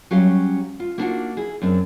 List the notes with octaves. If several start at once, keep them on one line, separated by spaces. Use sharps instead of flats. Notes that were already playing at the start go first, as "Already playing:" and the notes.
F#3 G3 C#4 G4 F5
F4
A#3 B3 D4 D#4 F4 F#4
E4 G#4
F#2 C4 D4